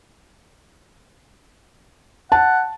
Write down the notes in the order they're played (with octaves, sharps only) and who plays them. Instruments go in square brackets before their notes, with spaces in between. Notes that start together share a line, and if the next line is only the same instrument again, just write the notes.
[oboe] F#5 [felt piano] A5